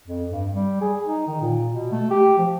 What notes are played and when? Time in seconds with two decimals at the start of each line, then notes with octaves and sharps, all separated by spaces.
0.07 F2
0.29 G2
0.52 G3
0.81 G#4
1.05 D#4
1.27 D#3
1.41 A#2
1.71 B2
1.92 A3
2.10 G4
2.38 F3